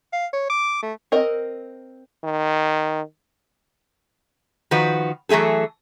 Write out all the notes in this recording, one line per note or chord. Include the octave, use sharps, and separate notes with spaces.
F5
C#5
D6
A3
C4 A#4 D#5
D#3
D#3 F3 F#4 B4
E3 F#3 A3 G#4 A4